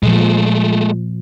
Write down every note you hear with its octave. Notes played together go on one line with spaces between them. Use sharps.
A#2 F3 G#3 A3